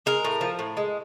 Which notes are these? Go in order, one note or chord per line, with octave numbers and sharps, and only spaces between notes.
G#3 A#4
A2
F3
A2
G#3